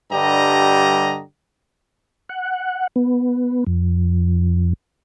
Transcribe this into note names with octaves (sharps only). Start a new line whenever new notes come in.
G2 D3 G3 G4 D#5 A#5
F#5
B3
F2